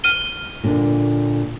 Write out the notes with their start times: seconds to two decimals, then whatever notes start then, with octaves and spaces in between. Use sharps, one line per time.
0.04 F6 D#7 G7
0.64 A#2 D3 D4